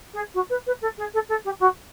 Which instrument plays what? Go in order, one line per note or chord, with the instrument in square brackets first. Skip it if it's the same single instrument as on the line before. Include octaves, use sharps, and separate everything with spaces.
[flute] G#4
F#4
B4
B4
A4
G#4
A4
A4
G4
F#4